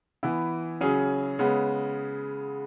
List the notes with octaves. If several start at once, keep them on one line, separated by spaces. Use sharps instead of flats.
E3 B3 E4
C#3 F#3 C#4 G#4
C#3 G#3 B3